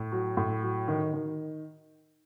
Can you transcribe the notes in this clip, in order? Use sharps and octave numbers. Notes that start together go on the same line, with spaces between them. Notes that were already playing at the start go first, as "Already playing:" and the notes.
Already playing: A2
F#3
A2
F#3
D#3
D#3